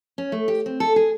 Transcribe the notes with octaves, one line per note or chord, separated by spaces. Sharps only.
C#4
A3
G4
C4
A4
G#4